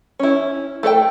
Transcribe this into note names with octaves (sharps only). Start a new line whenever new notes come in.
C#4 E4
A3 A4 C#5 G5